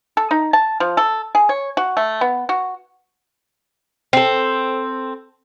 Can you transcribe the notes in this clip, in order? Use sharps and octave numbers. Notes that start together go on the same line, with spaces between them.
A4
D#4
A5
F3
A4
G#4
C#5
F#4
A3
B3
F#4
C4 A4